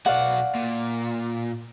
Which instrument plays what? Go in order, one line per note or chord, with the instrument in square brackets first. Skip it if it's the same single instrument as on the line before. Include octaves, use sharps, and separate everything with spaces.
[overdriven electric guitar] B1 F#4 [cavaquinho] D5 F5 F#5
[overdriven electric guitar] A#2